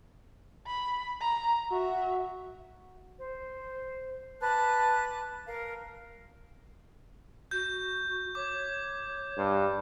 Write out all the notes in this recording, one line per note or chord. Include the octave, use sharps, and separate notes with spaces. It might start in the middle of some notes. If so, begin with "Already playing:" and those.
B5
A#5
F#4 E5
C5
B4 A5 D6 F#6
A#4 F5
F#4 G6
C#5 D6
G2